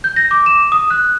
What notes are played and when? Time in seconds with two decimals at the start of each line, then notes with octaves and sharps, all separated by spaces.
0.04 G6
0.16 A#6
0.31 D6
0.46 E7
0.72 D#6
0.90 F#6